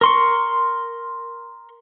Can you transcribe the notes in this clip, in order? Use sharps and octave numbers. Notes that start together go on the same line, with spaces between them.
A#4 C6 C#6